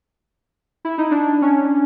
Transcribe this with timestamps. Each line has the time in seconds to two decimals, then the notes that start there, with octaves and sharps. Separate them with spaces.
0.85 E4
0.98 D#4
1.11 D4
1.42 C#4